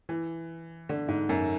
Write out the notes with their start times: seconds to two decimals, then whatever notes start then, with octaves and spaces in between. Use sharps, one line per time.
0.09 E3
0.89 D3
1.08 G#2
1.29 F#2